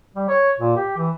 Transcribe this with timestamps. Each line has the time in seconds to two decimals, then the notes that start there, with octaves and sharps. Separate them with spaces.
0.16 G3
0.29 C#5
0.60 A#2
0.76 G4
0.97 E3